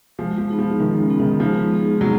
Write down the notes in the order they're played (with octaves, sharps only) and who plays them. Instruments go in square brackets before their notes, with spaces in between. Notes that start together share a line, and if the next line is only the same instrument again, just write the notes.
[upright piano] F3 [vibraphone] G#3
[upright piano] F3
[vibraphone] B3 D#4 G#4
[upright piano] F3
[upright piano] D#3 [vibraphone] G#3
[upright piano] C#3
[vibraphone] B3 D#4 G#4
[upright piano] D#3
[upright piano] F3 [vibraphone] G#3
[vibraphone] B3 D#4 G#4
[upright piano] F#3 [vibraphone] G#3